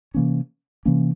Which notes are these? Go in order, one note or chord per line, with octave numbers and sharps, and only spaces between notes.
C3 E3 A#3 C#4
C3 E3 A#3 C#4